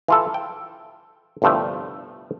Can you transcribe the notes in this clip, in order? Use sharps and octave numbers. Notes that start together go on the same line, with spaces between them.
E3 F4 A4
G5
G1 C2 G2 F3 A3